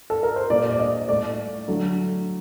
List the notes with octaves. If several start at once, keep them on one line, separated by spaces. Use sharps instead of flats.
A4
A#4
C5
A#2 G3 D5
D5
D#5
A2 A3 D5
D3 F#3 A3